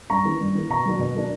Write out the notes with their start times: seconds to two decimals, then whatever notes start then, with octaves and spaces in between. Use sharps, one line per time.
0.10 G2 A#5 C#6
0.25 E3 A#3
0.41 G2
0.55 E3 A#3
0.70 B2 A#5 C#6
0.86 F#3 A#3 D4
0.99 B2
1.15 F#3 A#3 D4